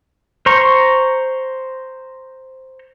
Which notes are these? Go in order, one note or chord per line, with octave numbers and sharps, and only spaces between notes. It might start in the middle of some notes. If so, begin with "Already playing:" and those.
C5 A#5 C#6